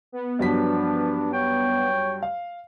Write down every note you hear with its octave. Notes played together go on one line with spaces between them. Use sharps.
B3
G2 F3 F#3 D4 B6
C#5 G5
F5